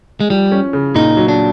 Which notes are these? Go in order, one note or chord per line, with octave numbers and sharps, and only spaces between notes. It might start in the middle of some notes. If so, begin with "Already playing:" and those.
G#3
F3 G3
C#4
C#3
A#2 D#4
F#3
D4